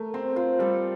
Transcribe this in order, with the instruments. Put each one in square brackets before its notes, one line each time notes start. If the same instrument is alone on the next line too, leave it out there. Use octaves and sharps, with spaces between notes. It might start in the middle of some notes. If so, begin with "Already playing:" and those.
Already playing: [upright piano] A3 [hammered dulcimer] A#4
[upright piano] C4 [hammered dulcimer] C5
[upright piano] F4 [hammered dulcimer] C5
[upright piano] G3 [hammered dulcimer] A4